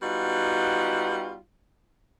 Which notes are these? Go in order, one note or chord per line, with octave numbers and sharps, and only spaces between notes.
G3 B3 D#4 F4 F#4